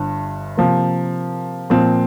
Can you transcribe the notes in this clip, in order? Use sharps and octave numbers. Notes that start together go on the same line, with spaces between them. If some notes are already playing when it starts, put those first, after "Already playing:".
Already playing: G1 G2
C3 F3 A#3
A#2 F3 C4